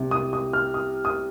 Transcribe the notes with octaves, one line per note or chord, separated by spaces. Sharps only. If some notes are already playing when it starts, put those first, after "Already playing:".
Already playing: C2 C3
D#6
D#6
F6
D#6
D#6